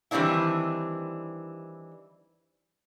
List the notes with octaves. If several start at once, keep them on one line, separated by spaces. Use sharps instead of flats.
D#3 E3 G3 C4 D4 E4